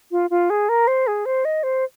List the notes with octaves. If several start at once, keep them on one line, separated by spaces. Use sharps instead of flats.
F4
F4
G#4
A#4
C5
G#4
C5
D#5
C5